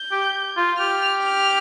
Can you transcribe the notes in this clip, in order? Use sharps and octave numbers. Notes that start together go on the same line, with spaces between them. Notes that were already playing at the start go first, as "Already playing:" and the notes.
Already playing: G6
G4
F4
G4 F6
F6